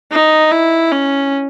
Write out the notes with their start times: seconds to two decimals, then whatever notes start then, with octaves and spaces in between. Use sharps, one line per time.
0.11 D#4
0.52 E4
0.92 C#4